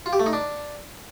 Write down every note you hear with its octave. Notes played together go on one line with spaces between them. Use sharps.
F4
G4
A3
D#4
D4